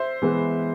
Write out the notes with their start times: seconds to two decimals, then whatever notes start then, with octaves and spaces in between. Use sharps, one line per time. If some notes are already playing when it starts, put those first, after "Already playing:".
Already playing: C5 E5
0.22 E3 G#3 B3